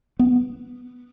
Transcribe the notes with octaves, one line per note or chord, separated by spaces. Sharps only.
B3